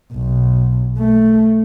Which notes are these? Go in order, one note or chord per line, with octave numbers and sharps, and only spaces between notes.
B1
A3